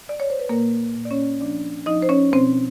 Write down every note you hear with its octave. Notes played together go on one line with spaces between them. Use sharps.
D5
C#5
C5
B4
A#2 A#3 A#4
A#2
D5
C#4 C#5
F3 D4 D5
F3 D#4 D#5
C5
C#4 C#5
B2 C4 C5